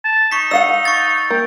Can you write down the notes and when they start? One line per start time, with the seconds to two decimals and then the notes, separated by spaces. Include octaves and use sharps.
0.04 A5
0.32 D#4 C#6 B6
0.51 D#5 F5 F#5 E6 C#7
0.85 C#6 A6
1.31 A#3 G5